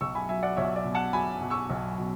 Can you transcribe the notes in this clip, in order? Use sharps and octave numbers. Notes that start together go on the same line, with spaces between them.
B1 C#6 E6
G#5 B5
F#3 E5 G#5
D5 F#5
B1 C#5 E5
D5
B2
F#5 A5
F#3 G#5 B5
B2
C#6 E6
B1
B2